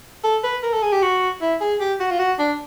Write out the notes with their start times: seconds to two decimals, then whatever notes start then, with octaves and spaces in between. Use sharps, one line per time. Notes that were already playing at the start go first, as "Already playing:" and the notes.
0.24 A4
0.44 B4
0.63 A#4
0.73 A4
0.83 G#4
0.93 G4
1.03 F#4
1.41 E4
1.61 G#4
1.80 G4
2.00 F#4
2.11 F4
2.19 F#4
2.39 D4